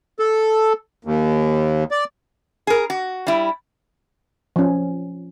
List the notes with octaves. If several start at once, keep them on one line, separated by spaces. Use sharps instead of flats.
A4
D#2
D5
G#4 A#4
F#4
G3 E4
F3 C#4